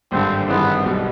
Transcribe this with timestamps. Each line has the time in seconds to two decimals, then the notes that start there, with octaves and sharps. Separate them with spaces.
0.12 G#1 G2 D3 C4
0.48 G2 D#3 G#3 B3 C4 E4
0.84 B1 B2 G3